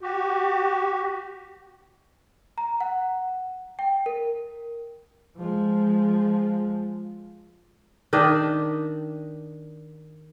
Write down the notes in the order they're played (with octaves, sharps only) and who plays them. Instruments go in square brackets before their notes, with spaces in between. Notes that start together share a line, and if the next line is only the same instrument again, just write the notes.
[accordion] F#4 G4
[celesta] A#5
F#5
G5
A#4
[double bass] F3 G#3
[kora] D#3 D4 D#5 E5